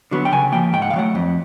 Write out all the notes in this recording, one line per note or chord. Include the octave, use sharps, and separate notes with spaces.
D3 F#3 B3
G5
C#3 G#5
F3 A#3 G5
G#2 G5
F#5
D#3 F5
F#3 A3 F#5
F2